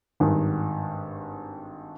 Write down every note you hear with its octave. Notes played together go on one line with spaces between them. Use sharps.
G#1 G2 D#3